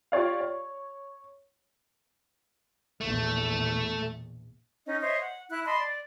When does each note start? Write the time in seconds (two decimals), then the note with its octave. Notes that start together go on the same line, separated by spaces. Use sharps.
0.12 F4 G4 C#5 D5 F5
0.40 C#5
3.01 A#1 E2 B2 A3
4.87 C#4 D#4 D#5
5.01 C5 C#5 D#5 E5
5.20 F#5
5.50 E4 F#6
5.66 D#5 A5 B5 C6
5.78 D5